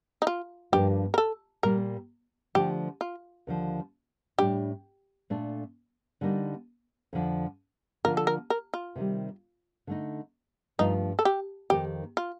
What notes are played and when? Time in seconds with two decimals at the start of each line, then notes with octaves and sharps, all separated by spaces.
0.22 D#4
0.27 F4
0.72 G2 F3 A#3 D4 G4
1.14 A#4
1.18 A4
1.63 A#2 G3 A#3 A#4
2.55 D3 F3 A3 G4
3.01 F4
3.47 D#2 D3 F3
4.38 A2 G3 D4 G4
5.30 A#2 A3 D4
6.21 D3 G3 A#3 D#4
7.13 F2 D3 F3
8.04 D3 F3 A#3 F4 A#4
8.17 A4
8.27 A#4
8.50 A#4
8.74 F4
8.96 C3 D#3 G3
9.87 D3 A3 D#4
10.79 G2 F3 A3 D4 D#4 F4
11.19 A4
11.25 G4
11.70 F2 D#3 A#3 D#4 G4
12.17 F4